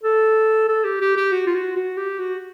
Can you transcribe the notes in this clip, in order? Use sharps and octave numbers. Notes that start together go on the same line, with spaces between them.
A4
A4
G4
G4
G4
F#4
F4
F#4
F#4
G4
F#4